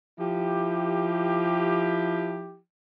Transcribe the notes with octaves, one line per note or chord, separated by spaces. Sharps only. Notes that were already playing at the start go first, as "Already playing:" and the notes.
F3 E4 G4